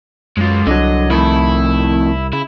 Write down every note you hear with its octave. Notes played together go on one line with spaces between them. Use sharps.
F#2 G#3 F4
C2 D3 F#3 D#5
F2 A2 D#3 E4
C#3 E4